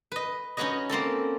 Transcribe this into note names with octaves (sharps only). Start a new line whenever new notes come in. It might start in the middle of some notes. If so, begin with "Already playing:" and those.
B4 D#5
C#4 D#4 F#4 B4 C#5 D#5
A#3 C4 C#4 A4